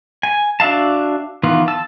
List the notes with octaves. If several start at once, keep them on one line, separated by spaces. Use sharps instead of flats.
G#5
D4 F#4 E5 F5 A5
D#3 E3 B3 F4
A5 E6